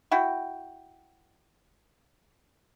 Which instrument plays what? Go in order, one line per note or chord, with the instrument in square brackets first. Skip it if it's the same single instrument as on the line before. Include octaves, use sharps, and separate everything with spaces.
[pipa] E4 F#4 G5